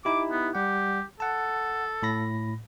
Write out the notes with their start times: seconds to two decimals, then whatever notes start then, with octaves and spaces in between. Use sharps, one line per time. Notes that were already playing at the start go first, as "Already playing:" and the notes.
0.05 D#4 E4 G4 D6
0.32 B3
0.55 G3 G4 F#5
1.20 A4 F#5 A5
2.03 A2 B5 A#6